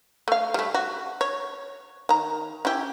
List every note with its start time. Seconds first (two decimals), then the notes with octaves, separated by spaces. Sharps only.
0.28 A3 F5
0.54 G3 A3
0.74 F#4
1.21 C#5
2.09 D#3 A#5
2.65 C#4 E4 G4